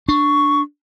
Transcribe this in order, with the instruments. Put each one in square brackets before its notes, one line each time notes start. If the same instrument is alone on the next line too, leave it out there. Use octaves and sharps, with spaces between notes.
[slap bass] D4 [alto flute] C#6